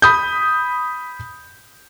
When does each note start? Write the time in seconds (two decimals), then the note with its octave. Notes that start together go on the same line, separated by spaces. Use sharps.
0.02 B5 D#6 G6